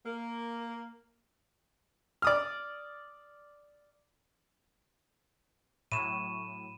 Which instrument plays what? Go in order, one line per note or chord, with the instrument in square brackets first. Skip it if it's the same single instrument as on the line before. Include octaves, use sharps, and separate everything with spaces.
[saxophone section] A#3
[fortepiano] D5 D#6 F6
[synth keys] A2 F#3 [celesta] B5 [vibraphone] C#6 [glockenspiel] D#7 E7